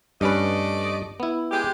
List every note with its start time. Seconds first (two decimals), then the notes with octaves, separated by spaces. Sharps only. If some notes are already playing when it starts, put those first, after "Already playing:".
0.21 G2 A3 C#4 B4 D5 D#5
1.20 B3 E4
1.51 G#3 G4